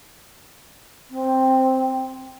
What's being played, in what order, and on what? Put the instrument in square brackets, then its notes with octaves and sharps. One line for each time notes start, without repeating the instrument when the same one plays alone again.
[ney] C4